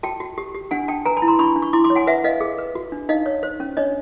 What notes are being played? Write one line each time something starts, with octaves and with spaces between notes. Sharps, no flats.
F#4 G5 A5
F#4
G4
G4
D4 F#5 G#5
D4 G5 A5
B4 G#5 A#5
A5 B5
E4
A#5 C6
D4 B5 C#6
D4
C#6
E4 C6 D6
C6 D6
C#5
F#5 G#5
B4 E5 F#5
B4 D#5 F5
G#4
B4
F#4
D4
D#4 D#5 F5
C#5
C5
C#4
D4 C#5 D#5